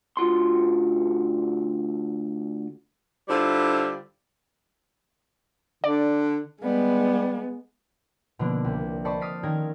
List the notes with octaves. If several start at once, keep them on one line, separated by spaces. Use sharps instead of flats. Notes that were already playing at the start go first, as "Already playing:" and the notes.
D2 F4 F#4 C6
D3 G3 E4 F4 C5
D3 D5
G3 G#3 B3
B2 D3 F3 A#3 C#4 D4
C2
C5 D5 D#5 A5 B5 C#6
D#6 F6 A6 B6 C7 D7
D#3 C#4 A4 A#4 F5 G#6